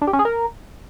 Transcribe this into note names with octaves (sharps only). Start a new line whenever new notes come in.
D4
G4
C#4
G#4
A#4